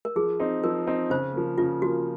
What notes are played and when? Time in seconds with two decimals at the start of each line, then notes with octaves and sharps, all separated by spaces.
0.05 A#4
0.16 F3 G#4
0.40 C4 D#4
0.64 F3 A#4
0.87 C4 D#4
1.10 C#3 C5
1.34 F3 A#3
1.58 C#3 F4
1.81 F3 A#3 F#4